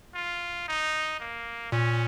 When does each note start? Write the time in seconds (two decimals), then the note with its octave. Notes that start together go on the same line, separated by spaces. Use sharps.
0.15 F4
0.68 D#4
1.20 A#3
1.72 A#2 C#4